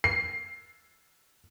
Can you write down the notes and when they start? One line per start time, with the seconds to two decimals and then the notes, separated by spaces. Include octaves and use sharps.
0.04 C7